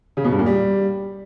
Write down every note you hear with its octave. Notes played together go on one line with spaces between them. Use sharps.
C#3
B2
G2
A#2
G3